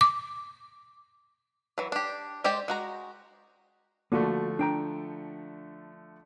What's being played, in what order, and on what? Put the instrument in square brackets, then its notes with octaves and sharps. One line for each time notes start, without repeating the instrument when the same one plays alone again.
[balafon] D6
[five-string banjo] E3 F#3
D4 G4
G#3 G4 C5 D5 G5
G#3 F#4 A#5
[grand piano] D3 F3 A3 [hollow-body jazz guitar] A#3 F4 F#4
[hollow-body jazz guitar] D4 G5 A#5